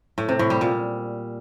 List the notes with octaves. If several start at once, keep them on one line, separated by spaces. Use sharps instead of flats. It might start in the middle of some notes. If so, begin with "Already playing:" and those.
A2
C3
A2
G3
A#2